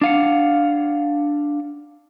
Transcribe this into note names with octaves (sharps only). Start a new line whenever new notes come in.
D4 F5 F#5